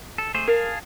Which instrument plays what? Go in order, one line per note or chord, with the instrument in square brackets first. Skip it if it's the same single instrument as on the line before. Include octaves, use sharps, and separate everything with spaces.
[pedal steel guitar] A4
A3 G#4 C5
[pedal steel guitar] G#4 F5 A5 [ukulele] A#4